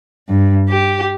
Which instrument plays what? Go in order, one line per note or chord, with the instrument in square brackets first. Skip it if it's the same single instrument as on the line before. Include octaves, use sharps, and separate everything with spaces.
[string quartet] G2
G4